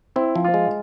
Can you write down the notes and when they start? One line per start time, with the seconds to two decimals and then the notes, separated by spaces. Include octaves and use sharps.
0.16 C4 E4
0.35 F3
0.44 F4
0.54 G#3